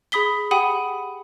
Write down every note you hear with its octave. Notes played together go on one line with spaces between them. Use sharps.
G#4 B5 D#6 B6 G7
G4 F#5 G5 B5 D#6 D#7